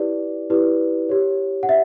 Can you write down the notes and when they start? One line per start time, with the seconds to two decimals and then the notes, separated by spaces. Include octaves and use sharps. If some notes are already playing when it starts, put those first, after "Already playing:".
Already playing: E4 G4 B4 D5
0.50 E4 G4 B4 D5
1.09 G4 C#5
1.63 F#5
1.69 E5